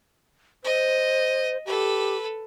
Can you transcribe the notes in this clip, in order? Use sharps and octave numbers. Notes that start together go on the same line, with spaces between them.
C5 D#5
G4 A4 B4